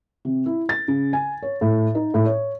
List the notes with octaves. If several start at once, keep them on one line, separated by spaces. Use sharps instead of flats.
C3
E4
A6
C#3
G#5
C#5
A2
D#4
A2
C#5